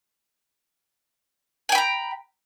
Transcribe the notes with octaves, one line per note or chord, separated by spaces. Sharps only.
G5 G#5 A#5 B5